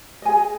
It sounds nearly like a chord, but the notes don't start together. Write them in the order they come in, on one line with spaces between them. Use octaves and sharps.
D#5 G#5 G#4